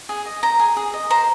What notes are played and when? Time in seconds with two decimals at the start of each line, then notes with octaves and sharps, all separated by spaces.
0.09 G#4
0.25 D#5
0.43 C5 A#5
0.60 G#4
0.77 G#4
0.94 D#5
1.10 C5 A#5